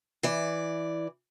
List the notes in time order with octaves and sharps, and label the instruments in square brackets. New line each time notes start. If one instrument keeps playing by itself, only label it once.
[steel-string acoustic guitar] E3 D5